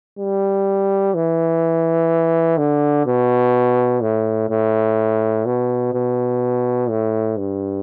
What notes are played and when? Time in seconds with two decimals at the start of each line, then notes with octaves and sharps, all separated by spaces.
0.19 G3
1.14 E3
2.58 D3
3.06 B2
4.01 A2
4.50 A2
5.46 B2
5.93 B2
6.89 A2
7.37 G2